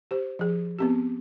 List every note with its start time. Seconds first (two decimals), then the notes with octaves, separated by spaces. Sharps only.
0.11 G4 C5
0.39 F3 G#4
0.79 B3 C4 G4